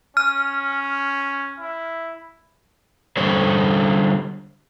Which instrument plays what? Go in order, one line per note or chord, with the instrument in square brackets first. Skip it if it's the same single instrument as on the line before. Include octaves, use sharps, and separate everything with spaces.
[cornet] C#4 [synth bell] F6
[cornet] E4
[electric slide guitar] D3 G3 C5 C#5